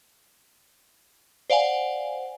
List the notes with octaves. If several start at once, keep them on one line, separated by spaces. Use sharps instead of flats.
C5 D5 F5 F#5 G#5